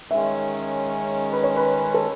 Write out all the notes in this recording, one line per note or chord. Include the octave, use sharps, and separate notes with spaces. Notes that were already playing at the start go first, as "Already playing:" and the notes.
D#3 G#3 C#4 E5
B4
C#5
B4
A4